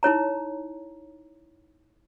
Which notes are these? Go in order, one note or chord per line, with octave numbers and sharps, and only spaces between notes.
D#4 E4 C#5 A#5